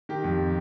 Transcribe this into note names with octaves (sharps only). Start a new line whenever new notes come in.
D#3 G4
F2